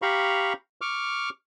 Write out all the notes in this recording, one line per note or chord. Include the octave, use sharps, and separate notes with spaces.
G4 F5 A#5 B5 C#6
C#6 D6 F6